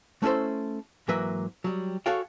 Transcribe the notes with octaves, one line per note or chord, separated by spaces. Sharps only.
A3 C#4 E4 A4 C5
G#2 E3 F#3 A#3 B4 E5
F#3 G3
F#4 G#4 A4 C#5 F5 G5